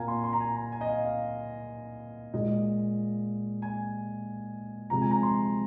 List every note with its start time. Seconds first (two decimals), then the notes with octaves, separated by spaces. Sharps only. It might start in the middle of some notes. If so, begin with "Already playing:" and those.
Already playing: A#2 A#3 F5 G#5 A#5
0.08 C6
0.24 C6
0.33 A#5
0.40 G#5
0.56 A#5
0.72 G#5
0.81 D#5
0.88 F5
1.04 F5
2.34 A#2 G#3 D#5
3.62 G#5
4.90 C3 F3 G#3 A#5
5.01 G#5
5.11 A#5
5.23 C6